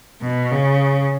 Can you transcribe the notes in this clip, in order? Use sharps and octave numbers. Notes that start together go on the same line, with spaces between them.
B2
C#3